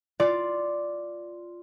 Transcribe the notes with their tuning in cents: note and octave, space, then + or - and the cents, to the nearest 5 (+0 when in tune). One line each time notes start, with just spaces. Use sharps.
F4 +0 D5 +0